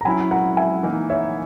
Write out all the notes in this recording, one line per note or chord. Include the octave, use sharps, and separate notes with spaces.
A#5
F#3 C#4 E4 G#5 B5
F#5 A#5
E5 G#5
E3 A#3 D#4
C#5 E5